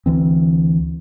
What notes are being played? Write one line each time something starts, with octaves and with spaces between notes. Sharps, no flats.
D2 E3 C4